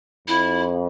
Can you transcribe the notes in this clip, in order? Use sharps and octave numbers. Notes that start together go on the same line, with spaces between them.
F2 E4